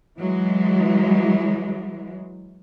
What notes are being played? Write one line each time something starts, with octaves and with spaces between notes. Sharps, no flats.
E3 F#3 G#3